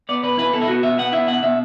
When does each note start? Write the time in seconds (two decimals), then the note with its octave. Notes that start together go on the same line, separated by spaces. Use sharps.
0.09 B3 D5
0.23 B2 B4
0.38 E4 B4
0.53 B2 A4
0.61 E4
0.68 B3 F#4
0.83 B2 E5
0.98 B3 F#5
1.12 E4 E5
1.27 B2 F#5
1.43 B2 E5